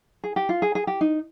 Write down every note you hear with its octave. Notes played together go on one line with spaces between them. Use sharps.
G#4
G4
F4
G#4
G#4
G4
D#4